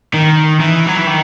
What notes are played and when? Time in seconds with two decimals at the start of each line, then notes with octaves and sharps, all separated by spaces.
0.14 D#3
0.61 E3
0.87 F#3
0.96 E3
1.07 D#3